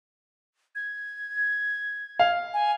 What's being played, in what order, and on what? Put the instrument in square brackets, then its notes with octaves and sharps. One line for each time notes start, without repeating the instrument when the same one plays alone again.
[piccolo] G#6
[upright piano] F5
[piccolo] G#5